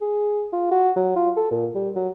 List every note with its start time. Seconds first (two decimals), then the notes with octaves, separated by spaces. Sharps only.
0.01 G#4
0.53 F4
0.71 F#4
0.96 F#3
1.16 F4
1.36 A4
1.51 A#2
1.75 G3
1.96 F#3